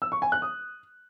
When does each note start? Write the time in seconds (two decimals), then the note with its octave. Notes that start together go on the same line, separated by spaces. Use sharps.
0.02 E6
0.12 C#6
0.22 G#5
0.32 F#6
0.42 D#6